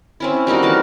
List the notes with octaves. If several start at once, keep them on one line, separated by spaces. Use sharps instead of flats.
C4 C#4 E4
G3 A#3 D#4 F#4
E3 A#4 A5